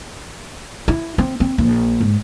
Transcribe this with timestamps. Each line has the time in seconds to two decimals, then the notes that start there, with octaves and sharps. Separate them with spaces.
0.88 E4
1.18 C4
1.40 C4
1.58 A#1
2.01 G#2